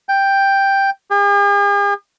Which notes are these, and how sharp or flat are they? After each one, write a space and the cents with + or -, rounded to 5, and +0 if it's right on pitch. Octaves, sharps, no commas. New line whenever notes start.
G5 +5
G#4 -45